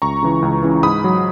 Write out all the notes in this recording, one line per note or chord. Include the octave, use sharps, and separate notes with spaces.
C#2 A#5 C#6
C#3 E3
C#2
C#3 E3
G#2 B5 D#6
F#3